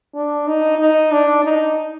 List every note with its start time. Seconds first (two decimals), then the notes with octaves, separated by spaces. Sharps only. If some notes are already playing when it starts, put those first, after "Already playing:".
0.15 D4
0.47 D#4
0.79 D#4
1.12 D4
1.44 D#4